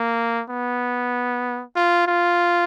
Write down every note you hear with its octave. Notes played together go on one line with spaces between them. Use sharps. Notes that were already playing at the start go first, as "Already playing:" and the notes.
Already playing: A#3
B3
F4
F4